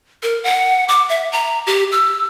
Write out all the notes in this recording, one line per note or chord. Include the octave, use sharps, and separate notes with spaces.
A#4
F#5
D6
E5
A#5
G4
E6